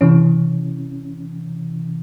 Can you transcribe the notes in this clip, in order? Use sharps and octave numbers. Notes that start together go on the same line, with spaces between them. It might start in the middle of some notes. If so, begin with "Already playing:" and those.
C3 E3 C#4